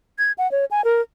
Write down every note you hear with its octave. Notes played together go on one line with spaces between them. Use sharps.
G#6
F#5
C#5
G#5
A#4